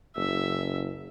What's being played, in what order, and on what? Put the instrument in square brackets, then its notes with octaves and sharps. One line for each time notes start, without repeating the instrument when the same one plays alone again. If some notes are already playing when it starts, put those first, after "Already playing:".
[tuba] F#1 [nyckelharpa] E5